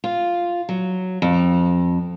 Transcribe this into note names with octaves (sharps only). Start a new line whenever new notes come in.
F4
F#3
F2